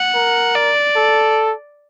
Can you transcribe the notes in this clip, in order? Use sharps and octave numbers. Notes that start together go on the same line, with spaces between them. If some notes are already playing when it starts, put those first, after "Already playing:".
Already playing: F#5
A#4
D5
A4